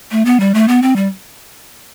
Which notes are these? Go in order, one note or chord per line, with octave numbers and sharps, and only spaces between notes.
A3
B3
G3
A3
B3
C4
G3